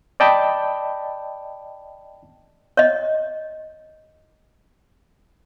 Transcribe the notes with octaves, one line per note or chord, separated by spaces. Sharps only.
D5 D#5 G5 A5 B5
C#5 D#5